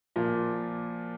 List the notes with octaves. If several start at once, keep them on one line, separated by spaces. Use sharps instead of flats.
A#2 F3 A#3